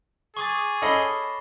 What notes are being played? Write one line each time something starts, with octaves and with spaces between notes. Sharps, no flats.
G#4 C#6 D6 A6
C#4 A4 D#5 B5 C7